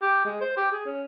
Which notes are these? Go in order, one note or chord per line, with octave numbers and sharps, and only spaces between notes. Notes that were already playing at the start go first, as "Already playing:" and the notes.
G4
G#3
C5
G4
G#4
C#4